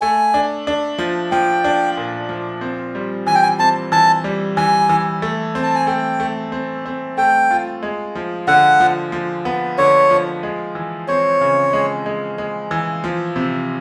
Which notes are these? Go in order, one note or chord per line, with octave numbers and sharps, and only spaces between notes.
A3 G#5
D4
D4
F3
F3 G5
D4
A#2
F3
C4
G3
E3 G#5
G5
G#5
C4 A5
E3 A5
G3
E3 G#5
E3
A3
C4
A5
G#5
A3 G5
A3
C4
C4
A3 G5
F4
G#3
F3
D3 F#5
F3
F3
B3
D3 C#5
F3
G#3
E3
C4 C#5
C#3
G#3
G#3
G#3
E3
F3
C3